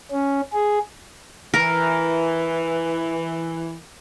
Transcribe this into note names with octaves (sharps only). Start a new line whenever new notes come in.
C#4
G#4
E3 A#4